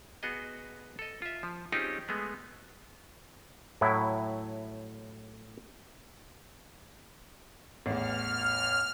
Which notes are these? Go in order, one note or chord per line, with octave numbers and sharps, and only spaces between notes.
B3 F#4 G#4 D#5
A4 D#5
F4 E5
F3
C4 C#4 D#4 F4 G4 G#4
G#3 A3 B3 G#4
A2 F#3 E4
A1 E2 F6